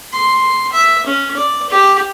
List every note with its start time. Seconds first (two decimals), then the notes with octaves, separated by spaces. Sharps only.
0.12 C6
0.73 E5
1.07 C#4
1.37 D5
1.70 G4